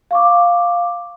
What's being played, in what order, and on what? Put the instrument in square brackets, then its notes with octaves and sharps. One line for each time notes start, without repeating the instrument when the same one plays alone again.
[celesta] F5 C#6 D6